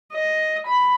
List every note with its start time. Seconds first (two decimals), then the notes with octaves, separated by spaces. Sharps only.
0.13 D#5
0.66 B5